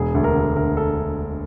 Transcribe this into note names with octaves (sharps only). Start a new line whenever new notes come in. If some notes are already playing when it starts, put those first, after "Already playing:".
Already playing: E1 G#4
D2
A#4
D3
D2 A#4
A4